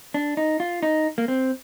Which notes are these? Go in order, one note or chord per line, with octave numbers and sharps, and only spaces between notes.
D4
D#4
F4
D#4
A#3
C4